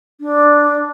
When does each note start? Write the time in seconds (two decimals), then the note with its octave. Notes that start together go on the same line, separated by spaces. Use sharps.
0.21 D4